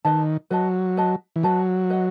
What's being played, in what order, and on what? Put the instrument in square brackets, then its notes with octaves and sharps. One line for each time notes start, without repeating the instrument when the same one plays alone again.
[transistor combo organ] D#3 [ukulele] B4 D#5 A5
[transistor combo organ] F#3 [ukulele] B4 D#5 A5
[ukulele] B4 D#5 A5
[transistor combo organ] E3
[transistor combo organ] F#3 [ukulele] B4 D#5 A5
[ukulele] B4 D#5 F#5